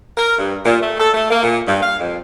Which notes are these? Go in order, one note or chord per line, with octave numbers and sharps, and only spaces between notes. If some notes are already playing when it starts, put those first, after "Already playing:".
A#4
G2
A#2
A3
A4
A3
A#3
A#2
G2
F5
F2